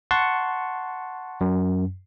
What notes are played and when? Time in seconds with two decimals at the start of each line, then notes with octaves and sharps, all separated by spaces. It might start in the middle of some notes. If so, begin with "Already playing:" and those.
0.11 F#5 A5 C6 C#6
1.41 F#2